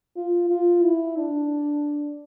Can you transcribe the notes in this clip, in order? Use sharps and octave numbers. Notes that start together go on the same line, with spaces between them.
F4
F4
E4
D4